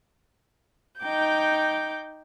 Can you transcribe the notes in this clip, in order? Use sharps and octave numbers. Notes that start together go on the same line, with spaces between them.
D#4 G5 D6 G6